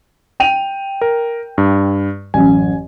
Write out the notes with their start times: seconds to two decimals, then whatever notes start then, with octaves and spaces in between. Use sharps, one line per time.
0.40 G5 D#7 F7
1.02 A#4
1.58 G2
2.34 A1 F#2 G#5